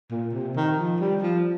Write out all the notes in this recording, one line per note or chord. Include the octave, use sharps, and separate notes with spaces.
A#2
C3
D#3
F3
G3
F3